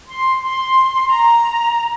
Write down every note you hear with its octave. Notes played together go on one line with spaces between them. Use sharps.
C6
C6
A#5